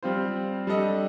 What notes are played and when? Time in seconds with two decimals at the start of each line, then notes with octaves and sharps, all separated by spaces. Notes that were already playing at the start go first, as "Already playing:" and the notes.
0.03 G3 C4 F4 C5
0.67 G3 D4 A4 D#5